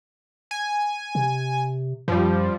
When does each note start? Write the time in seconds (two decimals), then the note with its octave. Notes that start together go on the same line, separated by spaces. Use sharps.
0.51 G#5
1.15 C3
2.08 F#2 F3 G3